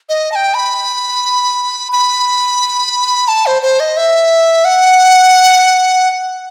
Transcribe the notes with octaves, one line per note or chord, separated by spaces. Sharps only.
D#5
A5
G5
B5
B5
A5
C5
C5
D#5
E5
F#5